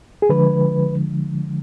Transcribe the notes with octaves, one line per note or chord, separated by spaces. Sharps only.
G#4
D3 F3 G#3 B4